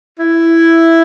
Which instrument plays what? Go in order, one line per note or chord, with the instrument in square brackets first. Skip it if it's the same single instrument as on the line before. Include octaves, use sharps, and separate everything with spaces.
[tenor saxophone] E4